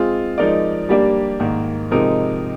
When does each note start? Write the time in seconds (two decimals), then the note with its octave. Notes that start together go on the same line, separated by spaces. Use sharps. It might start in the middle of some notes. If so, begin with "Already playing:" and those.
Already playing: G#3 C4 F4 G#4
0.38 F3 G#3 D#4 A#4 D5
0.89 G3 A#3 D4 G4 D5
1.40 G#2 D#3 A#3
1.91 C3 F3 G#3 D#4 A#4